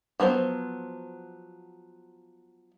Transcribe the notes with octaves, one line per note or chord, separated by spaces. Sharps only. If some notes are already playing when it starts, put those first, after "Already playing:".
F3 F#3 B3 C5